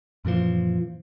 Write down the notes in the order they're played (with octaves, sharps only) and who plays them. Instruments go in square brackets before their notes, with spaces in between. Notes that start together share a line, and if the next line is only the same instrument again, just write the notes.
[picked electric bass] F#2 A#2 E3 F3